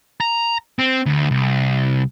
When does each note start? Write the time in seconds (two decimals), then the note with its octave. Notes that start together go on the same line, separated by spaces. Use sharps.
0.21 A#5
0.79 C4
1.06 D2
1.31 C2